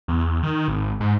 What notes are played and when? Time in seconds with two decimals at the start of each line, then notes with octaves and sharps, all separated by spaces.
0.08 E2
0.43 D#3
0.68 G#1
1.00 G#2